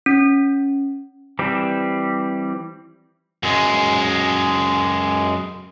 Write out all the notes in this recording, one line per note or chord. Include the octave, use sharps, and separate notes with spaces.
C#4
E3 G3 C4
F#2 G#3